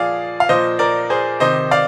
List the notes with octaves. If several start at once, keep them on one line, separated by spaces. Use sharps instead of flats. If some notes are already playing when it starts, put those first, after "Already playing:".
Already playing: A#2 F3 G#4 D5 F5
F5
A#2 F3 C5 D#5
A#4 D5
G#4 C5
C3 D#3 C5 D#5
D5 F5